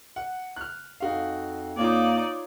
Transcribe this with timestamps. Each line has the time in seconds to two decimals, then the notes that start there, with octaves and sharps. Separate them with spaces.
0.16 F#5
0.56 F6 F#6
1.00 F2 D#4 F#4 F5
1.77 A#3 D#4 F4 C#5 D5